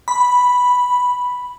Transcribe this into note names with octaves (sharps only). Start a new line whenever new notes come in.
B5